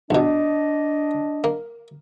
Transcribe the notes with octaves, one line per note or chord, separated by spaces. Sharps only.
A#1 B2 D4 D#5
A#3